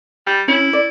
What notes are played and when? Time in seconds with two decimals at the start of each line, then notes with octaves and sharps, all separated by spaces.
0.26 G3
0.48 C#4 E4
0.73 D5